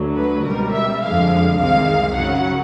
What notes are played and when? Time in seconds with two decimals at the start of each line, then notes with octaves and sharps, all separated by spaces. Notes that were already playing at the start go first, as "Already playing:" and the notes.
Already playing: D2 D3 F#3
0.18 B4
0.46 C#2 B2 G3 A#4
0.75 E5
1.03 F2 D3 F3 G#3 F5
1.60 C2 C3 D#3 G#3 F5
2.15 F#2 C#3 F#3 F#5